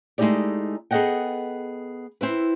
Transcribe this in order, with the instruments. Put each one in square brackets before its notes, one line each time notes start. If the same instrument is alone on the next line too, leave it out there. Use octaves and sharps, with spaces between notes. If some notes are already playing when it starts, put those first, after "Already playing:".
[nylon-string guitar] G#3 A3 D#4 E4 G4 D5
B3 G#4 A4 D#5 F#5 G5
C4 E4 B4